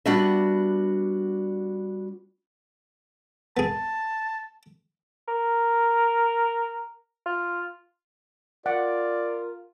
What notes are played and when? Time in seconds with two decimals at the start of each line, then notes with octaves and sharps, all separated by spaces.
0.06 G3 B3 D4 F#4 G4 E5
3.57 B3 G#4 A5
5.28 A#4
7.26 F4
8.66 F4 A#4 D5 F#5